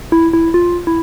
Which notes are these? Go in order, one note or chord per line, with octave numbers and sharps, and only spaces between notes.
E4
E4
F4
E4